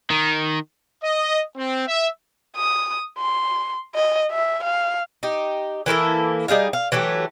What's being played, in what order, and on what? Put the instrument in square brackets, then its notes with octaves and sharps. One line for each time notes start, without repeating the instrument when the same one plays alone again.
[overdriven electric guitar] D#3
[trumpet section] D#5
C4
E5
[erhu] D#6
C6
D#5
E5
F5
[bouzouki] D#4 G4
E3 A#3 E4 A4
G3 D#4 G#4 F5
F5
E3 F#3 A3 G4